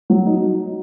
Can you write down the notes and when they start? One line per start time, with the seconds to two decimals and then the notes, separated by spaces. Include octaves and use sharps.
0.10 F#3
0.26 D#4